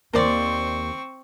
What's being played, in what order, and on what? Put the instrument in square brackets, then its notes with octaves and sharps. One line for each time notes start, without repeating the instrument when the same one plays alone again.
[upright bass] D#2 A#3 [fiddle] C4 C#6 [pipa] A#4 C5 D5